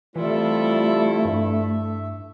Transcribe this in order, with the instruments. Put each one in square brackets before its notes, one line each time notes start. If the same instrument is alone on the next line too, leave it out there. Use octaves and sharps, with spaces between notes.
[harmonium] C3 G3 F4 [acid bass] E3 [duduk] A3 [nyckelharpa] E4 A4
[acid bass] G2 [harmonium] E5